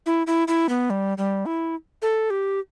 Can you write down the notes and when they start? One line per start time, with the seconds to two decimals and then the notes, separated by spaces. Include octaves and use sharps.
0.06 E4
0.27 E4
0.48 E4
0.69 B3
0.90 G3
1.18 G3
1.46 E4
2.02 A4
2.30 G4